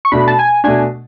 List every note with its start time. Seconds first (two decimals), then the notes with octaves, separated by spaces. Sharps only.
0.05 C#6
0.12 B2 A3 D4 B5
0.28 A5
0.39 G#5
0.64 B2 A3 D4 G#5